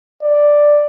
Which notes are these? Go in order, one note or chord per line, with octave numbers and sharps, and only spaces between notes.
D5